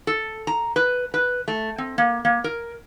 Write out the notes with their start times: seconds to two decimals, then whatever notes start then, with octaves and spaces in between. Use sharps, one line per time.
0.07 A4
0.47 A#5
0.76 B4
1.14 B4
1.48 A3
1.78 C4
1.98 A#3
2.25 A#3
2.44 A#4